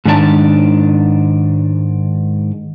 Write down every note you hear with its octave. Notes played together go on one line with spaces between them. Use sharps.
G#2 D#3 D4 G#4 A5